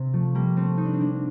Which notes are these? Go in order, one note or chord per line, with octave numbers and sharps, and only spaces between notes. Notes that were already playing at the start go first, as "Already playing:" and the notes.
Already playing: C3 C4
F3 A3
G3 A#3
A3 C4
D#4
D4
C4
A#3 D4